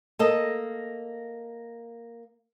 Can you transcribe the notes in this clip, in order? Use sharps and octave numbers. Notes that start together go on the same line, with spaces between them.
A#3 A4 D#5